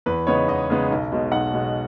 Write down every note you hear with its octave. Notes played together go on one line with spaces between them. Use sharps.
E2 B4
C#3 G#3 B3 D#4 C#5
E2 D#5
C#3 G#3 B3 D#4
B1
B2 G#3
B1 F#5
B2 G#3